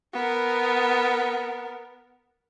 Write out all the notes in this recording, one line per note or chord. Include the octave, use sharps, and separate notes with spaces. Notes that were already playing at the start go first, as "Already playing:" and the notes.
B3 A#4